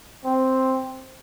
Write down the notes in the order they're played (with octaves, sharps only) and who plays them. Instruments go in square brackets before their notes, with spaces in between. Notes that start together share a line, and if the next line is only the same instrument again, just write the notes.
[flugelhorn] C4